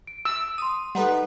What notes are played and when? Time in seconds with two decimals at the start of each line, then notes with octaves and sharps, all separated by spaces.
0.07 D7
0.25 E6
0.58 C6 D#6 D#7
0.95 G3 D#4 A4 B4 F#5